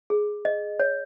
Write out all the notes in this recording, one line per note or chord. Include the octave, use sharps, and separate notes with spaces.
G#4
D#5
C#5